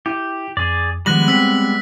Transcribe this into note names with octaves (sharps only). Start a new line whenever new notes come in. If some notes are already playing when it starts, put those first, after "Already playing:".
E4 G4 E5
F2 G#4 D5
D#3 F3 G3 G#3 B3 F#6 A#6 F#7
C4 G5 E6 B6